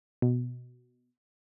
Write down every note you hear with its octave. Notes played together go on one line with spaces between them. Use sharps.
B2